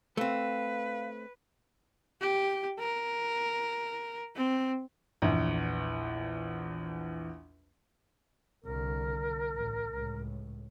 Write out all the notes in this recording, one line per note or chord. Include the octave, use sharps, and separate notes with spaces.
A3 C4 B4 F5
G4
A#4
C4
A#1 E2
C2 D3 A#4
A1
C#2 A2